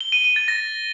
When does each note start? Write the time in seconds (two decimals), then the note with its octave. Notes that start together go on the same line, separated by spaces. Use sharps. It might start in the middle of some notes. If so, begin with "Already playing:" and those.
0.01 G7
0.12 D#7
0.24 D#7
0.36 A6
0.48 A#6